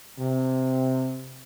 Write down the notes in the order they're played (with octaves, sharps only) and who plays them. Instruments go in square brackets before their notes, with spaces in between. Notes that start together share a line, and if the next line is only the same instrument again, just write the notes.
[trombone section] C3